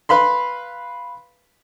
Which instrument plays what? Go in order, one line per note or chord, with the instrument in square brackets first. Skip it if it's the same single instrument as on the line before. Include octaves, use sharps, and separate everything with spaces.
[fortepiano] B4 F5 B5 C6